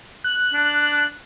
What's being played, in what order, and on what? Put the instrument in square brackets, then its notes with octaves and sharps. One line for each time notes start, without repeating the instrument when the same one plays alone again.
[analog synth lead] F#6
[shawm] D4